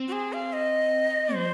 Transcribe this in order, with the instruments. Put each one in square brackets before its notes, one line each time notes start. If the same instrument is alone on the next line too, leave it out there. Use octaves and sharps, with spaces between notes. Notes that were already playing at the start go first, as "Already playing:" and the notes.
Already playing: [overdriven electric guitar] C4
[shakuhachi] F#4
G#4
F5
D#5
[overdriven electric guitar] F3 [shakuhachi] C5